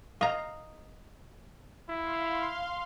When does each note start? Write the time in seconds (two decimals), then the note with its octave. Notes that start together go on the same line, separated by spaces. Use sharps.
0.21 D#5 F5 A#5
1.89 E4 F5 C6